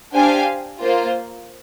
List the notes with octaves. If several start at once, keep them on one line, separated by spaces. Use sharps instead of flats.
D4 G4 C5 F5 G#5
A#3 F4 C5